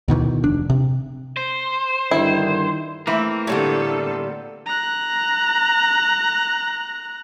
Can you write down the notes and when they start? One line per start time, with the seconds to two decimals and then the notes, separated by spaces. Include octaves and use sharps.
0.08 D2 B2 D#3 E3
0.43 F1 D4
0.70 C3
1.37 C5
2.11 G2 D3 D#3 E4
3.07 E3 A3 A#3 C4 E4
3.47 A2 D3 G3 B3 A4
4.67 A#5 F#6